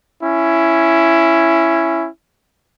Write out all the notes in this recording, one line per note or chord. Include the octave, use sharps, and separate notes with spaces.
C#4 E4